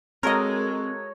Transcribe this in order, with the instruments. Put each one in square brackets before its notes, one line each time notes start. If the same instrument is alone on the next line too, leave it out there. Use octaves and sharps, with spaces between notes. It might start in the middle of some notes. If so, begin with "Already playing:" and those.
[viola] G#3 [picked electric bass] C4 [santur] F#4 A4 C#5 [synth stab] A#4 D#5